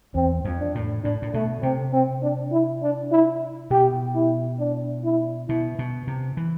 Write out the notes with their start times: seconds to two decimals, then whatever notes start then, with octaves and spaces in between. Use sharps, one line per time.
0.15 E2 C4
0.45 F2
0.60 D4
0.75 A2
1.04 A2 D4
1.22 A2
1.34 B2 A3
1.63 C3 C4
1.93 C4
2.23 D4
2.52 E4
2.82 D4
3.12 E4
3.70 B2 G4
4.15 E4
4.60 D4
5.04 E4
5.48 B2 E4
5.79 B2
6.07 C3
6.37 E3